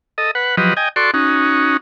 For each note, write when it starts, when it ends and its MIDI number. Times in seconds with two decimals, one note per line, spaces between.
0.18 0.31 69
0.18 0.31 75
0.35 0.56 71
0.35 0.56 78
0.57 0.74 53
0.57 0.74 54
0.57 0.74 67
0.57 0.74 71
0.57 0.74 75
0.77 0.89 75
0.77 0.89 79
0.77 0.89 80
0.96 1.11 66
0.96 1.11 69
0.96 1.11 74
0.96 1.11 84
0.96 1.11 85
1.14 1.77 61
1.14 1.77 63
1.14 1.77 66